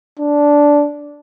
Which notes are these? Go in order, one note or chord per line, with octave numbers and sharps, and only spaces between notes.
D4